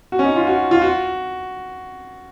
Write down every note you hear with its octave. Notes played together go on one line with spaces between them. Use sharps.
F#4
C#4
D#4
F4
F#4
F4
F#4